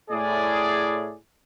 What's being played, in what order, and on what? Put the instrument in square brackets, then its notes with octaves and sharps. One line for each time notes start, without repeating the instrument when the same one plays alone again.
[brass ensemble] A2 G#4 D5